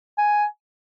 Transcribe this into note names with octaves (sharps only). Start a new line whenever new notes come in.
G#5